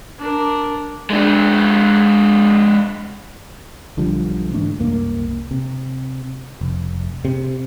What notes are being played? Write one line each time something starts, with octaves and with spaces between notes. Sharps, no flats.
D4 A#4
G#3 D4
B1 D3 F3 G3
G#2 E3 A3 D4
C2 F#2 A#3
C3
F1
C3